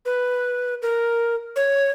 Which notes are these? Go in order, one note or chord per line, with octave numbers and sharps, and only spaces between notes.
B4
A#4
C#5